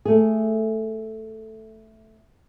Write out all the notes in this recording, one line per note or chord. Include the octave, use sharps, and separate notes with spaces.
A3 G#4